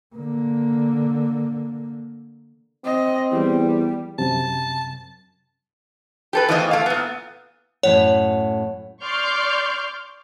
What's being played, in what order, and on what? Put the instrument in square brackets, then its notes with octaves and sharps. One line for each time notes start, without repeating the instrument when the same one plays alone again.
[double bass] D3 A#3
[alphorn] C4 [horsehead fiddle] D#5
[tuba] E2 [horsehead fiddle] G3
[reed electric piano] F#2 C3 [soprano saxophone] A5
[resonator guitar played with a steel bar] G4 A4 B4
E2 E3 F3 A3 D#4 D#5
A3 F5
A#2 B3
[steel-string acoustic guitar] F#2 A2 F#5 [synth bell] C#5
[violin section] D5 C6 C#6 F6 G6 C7